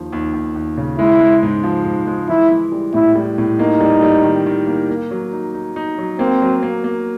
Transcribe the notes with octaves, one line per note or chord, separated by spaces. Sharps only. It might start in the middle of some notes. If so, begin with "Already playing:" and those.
Already playing: D#2 F3
D#2
D#2
D#2
C#3
G#3 E4
G#3
G#2
F3
G#2
G#3
E3 E4
E3
G3
A2 E4
G3
A2
A#3 D#4
G3
G3
D#3
D#3
A#3
A#3
F#3
D#4
D#4
D#4
F#3
A#3 C4
F#3
A#3
A#3